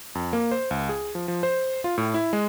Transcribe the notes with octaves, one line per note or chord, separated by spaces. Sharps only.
F2
A#3
C5
C#2
G#4
F3
F3
C5
F4
A2
E4
G#3